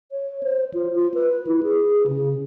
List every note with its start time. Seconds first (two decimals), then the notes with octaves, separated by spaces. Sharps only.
0.12 C#5
0.43 C5
0.74 F4
0.95 F4
1.14 B4
1.47 E4
1.63 G#4
2.07 C#3